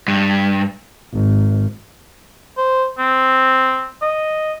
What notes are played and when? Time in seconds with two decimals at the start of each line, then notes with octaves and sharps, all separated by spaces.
0.08 G2
1.13 G#1
2.57 C5
2.99 C4
4.02 D#5